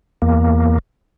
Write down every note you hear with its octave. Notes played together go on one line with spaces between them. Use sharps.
E2 A#3